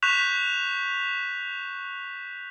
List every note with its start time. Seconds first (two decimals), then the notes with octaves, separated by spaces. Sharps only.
0.02 C#6 F#6 G6 B6 E7 F7